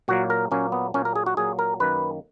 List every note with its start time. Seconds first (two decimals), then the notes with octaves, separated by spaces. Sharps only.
0.08 A#2 F#3 A#3 F#4
0.30 A#4
0.51 A#2 F#3 A#3 C#4
0.72 B3
0.94 A#2 F#3 A#3 C#4
1.05 A#4
1.15 G#4
1.26 F#4
1.37 A#2 F#3 A#3 G#4
1.59 A#4
1.80 F#2 D#3 A#3 B4